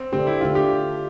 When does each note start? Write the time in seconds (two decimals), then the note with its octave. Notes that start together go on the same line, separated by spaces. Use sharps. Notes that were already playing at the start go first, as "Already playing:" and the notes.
Already playing: C4
0.13 D3 A3 C4 D4 G4
0.27 E4
0.41 D3 A3 D4 F4 G4
0.55 G4